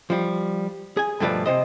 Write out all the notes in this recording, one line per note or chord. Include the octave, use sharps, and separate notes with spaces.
F3 G3
G#4 G#5
G2 B2 F3 A3 B4 D5
C3 C5 D#5